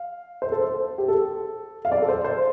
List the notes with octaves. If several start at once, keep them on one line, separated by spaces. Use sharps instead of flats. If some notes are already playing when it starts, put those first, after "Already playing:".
Already playing: F5
C5
A4
C5
G4
A4
F5
D5
A4
C5
C5